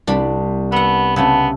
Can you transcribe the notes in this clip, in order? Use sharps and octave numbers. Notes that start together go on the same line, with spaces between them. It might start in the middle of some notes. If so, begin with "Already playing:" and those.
C2 D4 D5 B5
B3 A4 F#5
C#3 A3 B3 C4 D4 E6